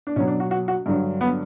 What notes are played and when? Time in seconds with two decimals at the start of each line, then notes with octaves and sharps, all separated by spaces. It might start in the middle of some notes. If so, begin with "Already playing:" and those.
0.07 D4
0.16 B2 F#3 C#4
0.27 D4
0.40 F#4
0.51 F#4
0.68 F#4
0.86 G2 D3 F#3
1.21 B3